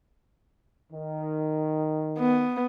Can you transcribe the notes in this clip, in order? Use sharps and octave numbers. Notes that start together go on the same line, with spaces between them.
D#3
B3